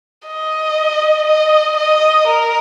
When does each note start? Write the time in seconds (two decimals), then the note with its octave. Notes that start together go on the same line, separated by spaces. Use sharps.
0.27 D#5
1.27 D#5
1.77 D#5
2.27 A#4